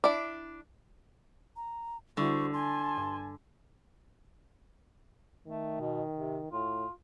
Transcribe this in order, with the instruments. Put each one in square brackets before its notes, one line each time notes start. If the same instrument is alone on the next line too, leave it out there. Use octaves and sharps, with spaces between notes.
[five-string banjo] D4 E4 D5
[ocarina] A#5
[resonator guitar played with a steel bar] D3 [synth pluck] G3 E4 [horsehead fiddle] F#4 C5 [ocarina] C#6
[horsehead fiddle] G#5 A5 [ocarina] C6
[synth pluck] G2
[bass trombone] D#3 [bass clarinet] A3
[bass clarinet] B2
C3
[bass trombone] A2 [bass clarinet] F4